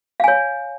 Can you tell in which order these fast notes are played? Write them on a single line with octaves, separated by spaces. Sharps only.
F5 G#5 C#5